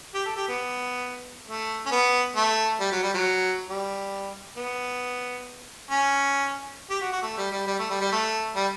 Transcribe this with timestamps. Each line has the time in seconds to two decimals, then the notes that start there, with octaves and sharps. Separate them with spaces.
0.14 G4
0.25 A4
0.36 G4
0.48 B3
1.47 A3
1.86 C#4
1.91 B3
2.36 A3
2.80 G3
2.91 F#3
3.02 G3
3.14 F#3
3.69 G3
4.57 B3
5.90 C#4
6.90 G4
7.01 F#4
7.12 F#4
7.22 A3
7.37 G3
7.52 G3
7.66 G3
7.78 A3
7.90 G3
8.00 G3
8.12 A3
8.55 G3